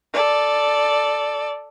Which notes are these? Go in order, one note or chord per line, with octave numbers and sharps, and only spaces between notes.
A4 D5